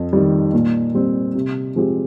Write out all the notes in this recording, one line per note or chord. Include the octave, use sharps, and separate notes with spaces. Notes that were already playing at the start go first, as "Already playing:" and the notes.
Already playing: F2
D#3 G3
A#2
G3 C4
C3
F3 G#3 C4 G4